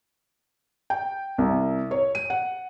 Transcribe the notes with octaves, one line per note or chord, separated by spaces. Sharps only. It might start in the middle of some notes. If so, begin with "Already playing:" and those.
G5
C2
C#5
D#7
F#5